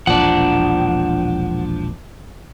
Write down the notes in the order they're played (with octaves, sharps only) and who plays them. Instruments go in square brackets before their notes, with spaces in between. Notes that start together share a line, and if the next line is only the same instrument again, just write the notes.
[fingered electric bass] E1 A#1 [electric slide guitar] F3 D4 [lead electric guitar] F#5